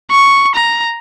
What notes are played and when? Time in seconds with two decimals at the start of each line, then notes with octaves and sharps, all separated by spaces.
0.11 C#6
0.56 A#5